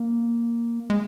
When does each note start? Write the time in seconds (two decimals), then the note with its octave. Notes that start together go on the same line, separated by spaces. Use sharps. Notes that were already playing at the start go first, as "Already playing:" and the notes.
Already playing: A#3
0.90 G#3